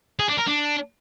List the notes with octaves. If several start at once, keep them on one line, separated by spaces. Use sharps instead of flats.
G#4
D4
A#4
D4